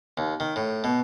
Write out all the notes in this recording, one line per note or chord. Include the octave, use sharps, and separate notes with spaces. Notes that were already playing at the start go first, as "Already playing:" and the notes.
D#2
D#3
A2
B2